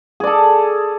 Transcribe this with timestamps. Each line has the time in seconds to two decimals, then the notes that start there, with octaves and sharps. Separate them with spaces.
0.20 G#4
0.24 D5
0.27 A4